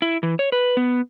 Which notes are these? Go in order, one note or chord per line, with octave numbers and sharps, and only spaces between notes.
E4
E3
C#5
B4
B3